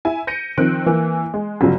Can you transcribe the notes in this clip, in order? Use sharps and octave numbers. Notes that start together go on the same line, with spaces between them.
E4 G#5
G6 A#6 C#7 D#7
D#3 F3 C4 F#6 D7
E3 A#3
G#3
G1 C#3 F#3